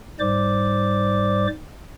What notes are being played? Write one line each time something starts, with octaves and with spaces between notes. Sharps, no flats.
G#2 G3 C5 D5 D6